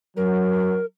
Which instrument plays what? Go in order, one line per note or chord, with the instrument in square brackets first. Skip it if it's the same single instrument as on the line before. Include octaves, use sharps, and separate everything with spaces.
[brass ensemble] F#3 [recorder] A#4